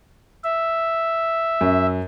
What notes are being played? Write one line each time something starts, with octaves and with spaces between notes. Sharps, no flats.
E5
F#2